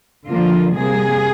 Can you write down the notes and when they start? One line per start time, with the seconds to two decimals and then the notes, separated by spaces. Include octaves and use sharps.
0.27 D3 F3 A#3 F4
0.74 C3 G3 A#3 G#4